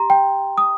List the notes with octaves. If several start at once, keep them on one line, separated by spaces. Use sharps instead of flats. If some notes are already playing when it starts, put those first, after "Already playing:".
Already playing: G4 A#5 C6
G5
D#6